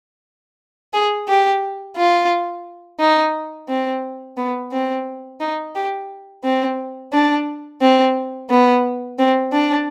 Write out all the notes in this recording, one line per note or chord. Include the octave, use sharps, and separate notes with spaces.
G#4
G4
F4
D#4
C4
B3
C4
D#4
G4
C4
D4
C4
B3
C4
D4